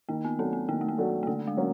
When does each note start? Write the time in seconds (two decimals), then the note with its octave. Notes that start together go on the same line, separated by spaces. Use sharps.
0.09 D#3 A#3
0.25 B3
0.38 F#3 A3 C4 D4 F#4
0.53 B3
0.69 D#3 A#3
0.81 A3
0.88 A#3
0.98 F#3 A3 D4 F#4
1.23 A#3
1.27 D3 A3
1.47 G#3
1.57 F#3 A#3 C#4